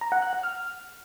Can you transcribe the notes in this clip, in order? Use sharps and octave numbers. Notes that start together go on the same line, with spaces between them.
A#5
F#5
F#6
F#5
F6